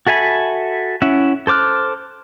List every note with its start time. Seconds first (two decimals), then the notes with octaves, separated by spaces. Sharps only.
0.07 F#4 A4 E5 G#5 B5
1.02 C#4 E4 E5 F#5
1.47 A4 C5 D6 F6 F#6